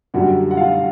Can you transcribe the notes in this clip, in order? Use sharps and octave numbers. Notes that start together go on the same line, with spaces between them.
F#2 D3 G3 F#4 F#5
F#5
F4 F5